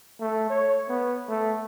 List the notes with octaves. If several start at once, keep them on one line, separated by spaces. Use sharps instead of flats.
A3
C#5
B3
A3